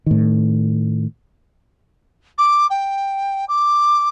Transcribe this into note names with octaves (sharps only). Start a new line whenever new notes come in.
A2 D#3
D6
G5
D6